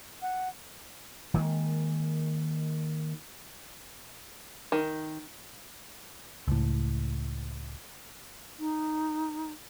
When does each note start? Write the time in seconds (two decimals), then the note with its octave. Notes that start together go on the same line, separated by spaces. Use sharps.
0.22 F#5
1.34 D#3 G#3 A#3
4.72 D#3
6.48 C#2 A2
8.59 D#4